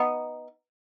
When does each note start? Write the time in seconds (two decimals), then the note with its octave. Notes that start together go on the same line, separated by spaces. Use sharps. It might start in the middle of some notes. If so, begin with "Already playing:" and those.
Already playing: B3 D#4